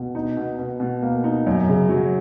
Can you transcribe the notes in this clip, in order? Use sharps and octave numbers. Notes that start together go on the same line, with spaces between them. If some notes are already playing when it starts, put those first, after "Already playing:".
Already playing: B2
D#4
B2
B2
B2
A#3
D#4
F#2
C#3
F#3